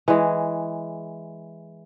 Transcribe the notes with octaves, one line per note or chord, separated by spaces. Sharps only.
E3 G#3